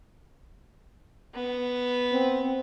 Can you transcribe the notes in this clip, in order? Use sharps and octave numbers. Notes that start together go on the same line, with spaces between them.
B3
C4